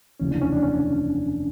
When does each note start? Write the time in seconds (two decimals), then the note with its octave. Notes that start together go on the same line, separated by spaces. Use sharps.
0.20 F1 D#2 C#3 E3 C#4
0.31 D4
0.41 C#4
0.53 D4
0.63 C#4